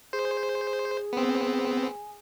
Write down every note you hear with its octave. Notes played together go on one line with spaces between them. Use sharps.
G#4 C5
B3 C4